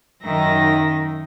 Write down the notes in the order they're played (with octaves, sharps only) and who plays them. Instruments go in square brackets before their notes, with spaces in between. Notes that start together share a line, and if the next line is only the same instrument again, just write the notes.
[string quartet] F#2 D#3 D#4 E5 A#6